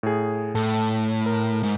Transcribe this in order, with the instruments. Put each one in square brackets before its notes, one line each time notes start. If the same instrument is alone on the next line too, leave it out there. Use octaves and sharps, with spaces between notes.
[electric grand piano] A2 G#4
[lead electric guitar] A2 [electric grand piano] A4
[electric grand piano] A#4
[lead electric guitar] G#2